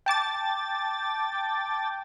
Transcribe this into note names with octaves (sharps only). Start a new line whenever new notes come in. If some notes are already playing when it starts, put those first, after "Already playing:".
G5 A5 D6 A6